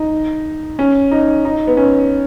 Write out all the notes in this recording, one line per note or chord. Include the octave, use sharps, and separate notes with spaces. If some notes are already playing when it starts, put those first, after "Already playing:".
Already playing: D#4
C#4
D#4
D#4
B3
C#4